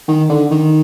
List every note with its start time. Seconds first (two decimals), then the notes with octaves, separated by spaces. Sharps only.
0.08 D#3
0.29 D3
0.51 D#3